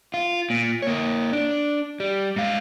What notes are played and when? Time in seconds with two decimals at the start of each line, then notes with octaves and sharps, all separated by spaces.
0.14 F4
0.50 A#2
0.82 A#3 C#5
1.33 D4
2.00 G3
2.36 G#2 F5